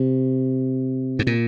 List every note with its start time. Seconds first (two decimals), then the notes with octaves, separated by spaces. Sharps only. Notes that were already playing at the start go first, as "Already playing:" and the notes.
Already playing: C3
1.19 G#2
1.27 A#2